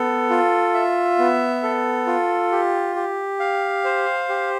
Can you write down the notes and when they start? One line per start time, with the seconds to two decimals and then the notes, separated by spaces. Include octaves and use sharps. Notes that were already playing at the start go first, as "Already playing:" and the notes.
Already playing: B3 A4
0.30 F4
0.74 E5
1.19 B3
1.63 A4
2.07 F4
2.51 G4
2.96 G4
3.40 F5
3.84 C5
4.29 G4